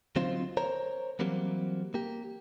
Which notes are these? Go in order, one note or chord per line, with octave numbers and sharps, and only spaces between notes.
D3 F#3 C4 D#4 F4 C5
A#4 C5 C#5 A#5
E3 F#3 G3 A#3 C4
A#3 G4